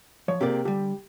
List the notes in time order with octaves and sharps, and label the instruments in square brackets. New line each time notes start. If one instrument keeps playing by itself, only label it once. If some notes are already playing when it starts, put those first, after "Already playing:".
[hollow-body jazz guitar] F3 [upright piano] C#5
[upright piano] C3 A#3 [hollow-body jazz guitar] G4 G#4 D5
[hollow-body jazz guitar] D3 G3 [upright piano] G4